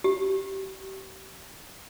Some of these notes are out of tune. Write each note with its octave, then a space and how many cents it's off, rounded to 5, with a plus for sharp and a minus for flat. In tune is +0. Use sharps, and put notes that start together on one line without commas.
G4 -35